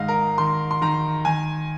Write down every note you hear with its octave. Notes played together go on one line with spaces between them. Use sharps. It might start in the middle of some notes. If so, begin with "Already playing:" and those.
Already playing: G#2 D#3 D#5 F5
A#4
D#3 C6
C6
D#3 A#5
D#3 G#5